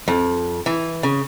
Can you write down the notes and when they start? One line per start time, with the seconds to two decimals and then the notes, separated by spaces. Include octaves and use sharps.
0.08 F2
0.66 E3
1.03 C#3